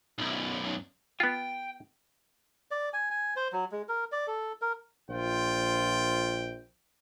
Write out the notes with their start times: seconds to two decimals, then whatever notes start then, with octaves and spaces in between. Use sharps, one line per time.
0.19 B1 F#2
1.20 B3 F4 G5
2.71 D5
2.93 G#5
3.11 G#5
3.36 C5
3.52 F#3
3.72 G#3
3.89 A#4
4.12 D5
4.27 A4
4.62 A#4
5.09 A#1 F4 C5 G5